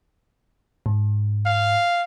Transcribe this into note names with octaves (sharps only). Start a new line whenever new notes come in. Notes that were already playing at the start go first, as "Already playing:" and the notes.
G#2
F5